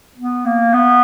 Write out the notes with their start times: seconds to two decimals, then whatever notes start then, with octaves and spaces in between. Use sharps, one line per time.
0.18 B3
0.45 A#3
0.74 B3